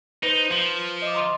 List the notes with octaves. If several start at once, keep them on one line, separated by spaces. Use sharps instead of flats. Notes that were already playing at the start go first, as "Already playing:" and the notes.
D#4 B4 C5
F3
D#5 D6
A#5 C6